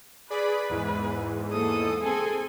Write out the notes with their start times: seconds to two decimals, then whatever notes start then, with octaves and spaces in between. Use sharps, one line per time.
0.30 G#4 B4 D5 B5
0.70 E2 G#2 E3
1.52 A#3 A4 D#6
2.02 C4 G#4 A4 G#5